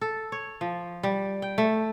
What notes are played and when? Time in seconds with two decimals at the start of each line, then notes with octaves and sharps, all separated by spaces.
0.01 A4
0.32 C#5
0.61 F3
1.03 G3
1.42 G5
1.58 A3